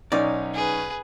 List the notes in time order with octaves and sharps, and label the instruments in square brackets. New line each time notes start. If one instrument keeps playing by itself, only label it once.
[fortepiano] B1 C#4 D#4 [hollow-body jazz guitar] D5
[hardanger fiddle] G#4 B4